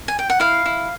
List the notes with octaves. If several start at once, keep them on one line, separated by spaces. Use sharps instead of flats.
G#5
G5
F#5
E4 F5
E4